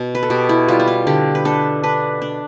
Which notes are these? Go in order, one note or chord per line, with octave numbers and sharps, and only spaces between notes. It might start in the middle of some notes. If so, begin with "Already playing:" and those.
Already playing: B2
B4
A4
B2 G4
E4
G3 F4
E4
F4
D3 G4
B4
D4 A4
D4 B4
D4